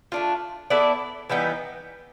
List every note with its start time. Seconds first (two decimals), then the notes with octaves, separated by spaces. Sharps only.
0.12 A3 D4 F4
0.70 B3 E4 A4 D5
1.30 E3 G3 B3 D#4